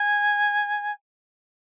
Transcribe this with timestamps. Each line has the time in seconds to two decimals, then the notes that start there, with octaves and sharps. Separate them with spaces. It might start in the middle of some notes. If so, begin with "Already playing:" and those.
Already playing: G#5